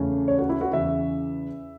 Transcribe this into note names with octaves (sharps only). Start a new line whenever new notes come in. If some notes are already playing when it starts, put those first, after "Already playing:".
Already playing: E2 C#3 A3 C#4
C#5
F#4
E4
F#4
E2 C#3 E3 E5